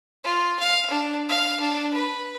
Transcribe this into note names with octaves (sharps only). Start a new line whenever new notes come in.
F4
F5
D4
F5
D4
B4